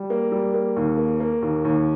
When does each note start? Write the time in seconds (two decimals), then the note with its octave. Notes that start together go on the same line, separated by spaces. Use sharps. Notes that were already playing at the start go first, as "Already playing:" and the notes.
Already playing: G3
0.10 A#3
0.32 G3
0.54 A#3
0.76 D#2
0.98 A#3
1.20 A#3
1.42 D#2
1.65 D#2